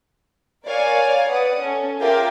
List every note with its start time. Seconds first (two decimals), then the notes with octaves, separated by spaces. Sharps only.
0.66 A#4 C#5 D5 F5 G#5
1.28 B4 D5 F#5 D#6
1.61 C#4 A4
1.99 F4 G#4 A#4 E5 G5 D6